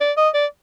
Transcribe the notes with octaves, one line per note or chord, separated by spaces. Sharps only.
D5
D#5
D5